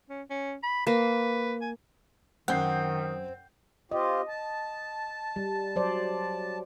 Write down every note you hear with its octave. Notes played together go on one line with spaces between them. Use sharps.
C#4
C#4
B5
A#3 B4
G#5
F#2 D#3 C4 F#5 G6 C7
C4 F4 G4 D#5
A5
G3
F#3 C5 D5